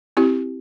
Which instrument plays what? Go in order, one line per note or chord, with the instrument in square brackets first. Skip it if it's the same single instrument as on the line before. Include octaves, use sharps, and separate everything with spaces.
[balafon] C4 E4 G4